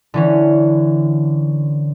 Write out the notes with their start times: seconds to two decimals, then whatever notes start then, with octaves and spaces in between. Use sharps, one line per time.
0.14 D3 E3 C#4